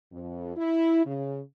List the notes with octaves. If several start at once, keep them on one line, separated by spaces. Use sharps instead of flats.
F2
E4
C#3